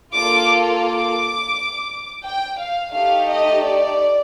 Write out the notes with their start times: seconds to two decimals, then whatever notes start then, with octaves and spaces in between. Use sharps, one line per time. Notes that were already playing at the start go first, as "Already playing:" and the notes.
0.15 A#3 F4 A4 D6
0.84 D6
2.24 G5
2.60 F5
2.94 A3 D#4 G4 F5
3.30 D#5
3.64 D5